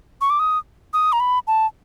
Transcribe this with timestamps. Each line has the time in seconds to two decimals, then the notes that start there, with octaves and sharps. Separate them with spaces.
0.21 C#6
0.30 D6
0.39 D#6
0.93 D#6
1.13 A#5
1.20 B5
1.47 A5